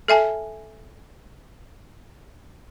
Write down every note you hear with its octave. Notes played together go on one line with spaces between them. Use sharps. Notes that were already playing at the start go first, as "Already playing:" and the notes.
A4 E5 G#5 A5